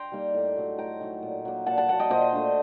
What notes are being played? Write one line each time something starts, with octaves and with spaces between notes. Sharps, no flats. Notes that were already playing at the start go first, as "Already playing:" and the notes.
Already playing: G5 A#5 C6
G3 A#3 D#4
A2
F#3 A3 D#4
A2 G5 A#5
F#3 A3 D#4
A#2
F#3 A#3
A#2 F#5 A5
F#5 A5
F#3 A#3 F#5 A5
D#5 G5
A#2 C5 D#5
A3 D4